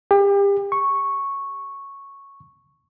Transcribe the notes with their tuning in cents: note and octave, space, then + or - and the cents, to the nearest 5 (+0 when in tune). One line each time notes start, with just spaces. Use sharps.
G4 +35
C#6 -5